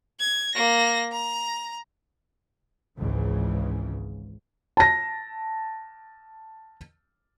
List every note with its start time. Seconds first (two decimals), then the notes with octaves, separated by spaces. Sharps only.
0.20 G#6
0.55 A#3 A#6
1.12 A#5
2.97 G#1 C#2 G#2 C#3 E3
4.77 A5 A#6